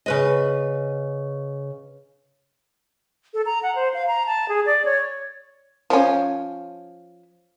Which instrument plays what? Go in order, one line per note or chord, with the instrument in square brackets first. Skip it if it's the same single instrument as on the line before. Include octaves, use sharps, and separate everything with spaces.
[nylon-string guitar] C#3 B4 D#5
[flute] A4
A#5
F#5
C5
F5
A#5
A5
G#4
D5
C#5
[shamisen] F3 C#4